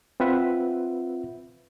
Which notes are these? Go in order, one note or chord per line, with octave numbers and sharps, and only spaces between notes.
C4 F4 B4 E5 F#5